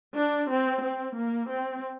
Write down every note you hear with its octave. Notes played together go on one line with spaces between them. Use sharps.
D4
C4
C4
A#3
C4